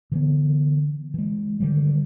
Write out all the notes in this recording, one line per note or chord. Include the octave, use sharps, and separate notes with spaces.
D3 E3 B3
E3 G#3
D3 D#3 G3